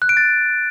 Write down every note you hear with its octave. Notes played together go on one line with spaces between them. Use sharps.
F#6
D7
A6